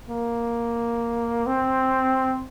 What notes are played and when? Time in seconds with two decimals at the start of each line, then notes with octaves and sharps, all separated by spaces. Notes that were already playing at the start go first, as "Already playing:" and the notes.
0.10 A#3
1.47 C4